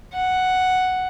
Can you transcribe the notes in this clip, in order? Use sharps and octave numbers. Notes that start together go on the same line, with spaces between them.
F#5